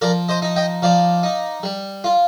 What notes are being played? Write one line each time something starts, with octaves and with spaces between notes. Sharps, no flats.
F3 A#4 D5
C5 D#5
D#4
D#5 G5
F3 D5 F5
D#4
G3
F4